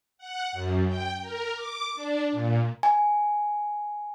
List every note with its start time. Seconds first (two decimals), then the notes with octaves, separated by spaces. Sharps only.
0.18 F#5
0.52 F#2
0.87 G5
1.21 A#4
1.55 D6
1.95 D4
2.32 A#2
2.83 G#5